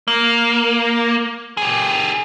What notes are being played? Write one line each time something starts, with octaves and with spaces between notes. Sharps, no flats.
A#3
G4 G#4